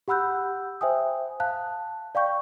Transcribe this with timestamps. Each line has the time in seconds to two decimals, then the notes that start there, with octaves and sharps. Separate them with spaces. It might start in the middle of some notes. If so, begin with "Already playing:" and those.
0.08 G4 F#5 B5 E6 F#6 G6
0.81 C5 E5 G5 G#5 D#6
1.40 F5 A5 F#6
2.15 D5 F5 G5 C#6 G6